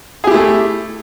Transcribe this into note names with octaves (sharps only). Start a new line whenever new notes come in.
A3 E4 G4 G#4